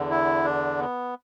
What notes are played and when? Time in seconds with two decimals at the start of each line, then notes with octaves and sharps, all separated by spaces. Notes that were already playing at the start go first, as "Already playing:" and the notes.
Already playing: E2 D3
0.10 E4
0.44 D4
0.79 B3